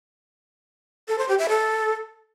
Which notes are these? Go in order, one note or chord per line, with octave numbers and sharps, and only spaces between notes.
A4
C5
G4
E5
A4